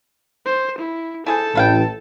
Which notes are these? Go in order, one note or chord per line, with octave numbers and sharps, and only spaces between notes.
C5
E4
E4 G#4 A4 C5 A5
A1 B4 F5 G5